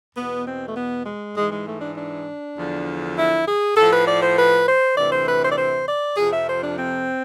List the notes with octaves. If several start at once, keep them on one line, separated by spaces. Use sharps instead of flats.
E2 B2 B3
C4
A3
B3
G#3
G#2 E3 G#3
G#3
A3
D4
D4
E2 D3 F3
E4
G#4
A2 F3 A4
B4
D5
C5
B4
C5
D2 C3 E3 D5
C5
B4
C5
D5
C5
D5
F2 C3 F3 G#4
E5
C5
D4
C4